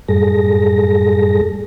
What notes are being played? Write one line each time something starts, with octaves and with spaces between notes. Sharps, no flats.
F#2 A2 G3 G#4 A4 A#6